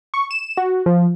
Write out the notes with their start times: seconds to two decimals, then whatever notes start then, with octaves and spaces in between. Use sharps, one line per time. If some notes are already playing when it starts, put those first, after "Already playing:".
0.14 C#6
0.31 E7
0.57 F#4
0.86 F3